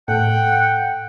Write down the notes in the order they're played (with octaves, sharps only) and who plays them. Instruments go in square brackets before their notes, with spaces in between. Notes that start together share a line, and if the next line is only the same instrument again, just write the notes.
[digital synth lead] A2 [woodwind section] F#5 G5